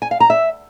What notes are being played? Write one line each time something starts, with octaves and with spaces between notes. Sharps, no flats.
G#5
F5
A#5
E5